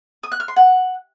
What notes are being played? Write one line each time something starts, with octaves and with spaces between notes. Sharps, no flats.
D#6
F#6
F6
C6
F#5